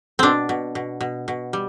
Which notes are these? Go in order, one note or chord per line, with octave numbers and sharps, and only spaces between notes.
B2 C4 D4
B2
B2
B2
B2
G3